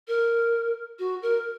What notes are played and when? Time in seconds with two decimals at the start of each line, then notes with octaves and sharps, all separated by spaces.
0.08 A#4
0.99 F#4
1.22 A#4